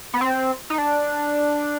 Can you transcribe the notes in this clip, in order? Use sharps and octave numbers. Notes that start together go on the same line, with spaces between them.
B3
C4
D#4
D4